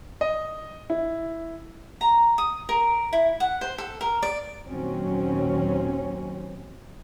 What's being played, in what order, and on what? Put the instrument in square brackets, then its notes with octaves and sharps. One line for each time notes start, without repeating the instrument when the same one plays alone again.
[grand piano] D#5
E4
[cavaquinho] A#5
D#6
A#4
E4
F#5
C5
A4
A#4
D5
[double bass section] D#2 A#2 D#3 F#3 C4 C#4